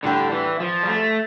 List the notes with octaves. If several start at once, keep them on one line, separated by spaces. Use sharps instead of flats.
A2 D3 G3 D4 G4
E3
F3
G3
A3